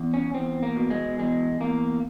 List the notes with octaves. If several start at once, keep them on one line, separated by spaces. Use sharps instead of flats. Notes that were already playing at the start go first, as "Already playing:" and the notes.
Already playing: E2
C#4
E2 C4
A#3
B2
G#3
E2 G#3
E2 A#3